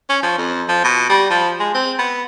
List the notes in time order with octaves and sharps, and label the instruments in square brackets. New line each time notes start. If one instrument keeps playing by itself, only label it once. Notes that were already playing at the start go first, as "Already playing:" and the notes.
[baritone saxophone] C#4
F3
F2
F3
B2
G3
F3
G#3
C4
B3